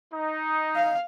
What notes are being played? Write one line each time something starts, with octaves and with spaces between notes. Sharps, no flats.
D#4
F5